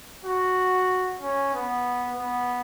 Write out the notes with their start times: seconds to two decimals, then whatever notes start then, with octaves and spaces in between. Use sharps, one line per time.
0.25 F#4
1.21 C#4
1.54 B3
2.18 B3